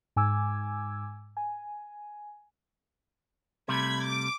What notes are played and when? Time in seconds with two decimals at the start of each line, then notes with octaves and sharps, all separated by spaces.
0.16 G#2 G#5 D6 E6 G#6
1.37 G#5
3.68 C3 G3 A3 B5 G#6
4.02 D6